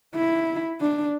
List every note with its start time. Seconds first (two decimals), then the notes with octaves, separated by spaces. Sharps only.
0.15 E4
0.81 D4